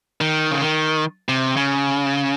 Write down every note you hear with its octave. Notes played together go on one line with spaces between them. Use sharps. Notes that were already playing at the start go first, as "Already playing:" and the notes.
D#3
C#3
D#3
C3
C#3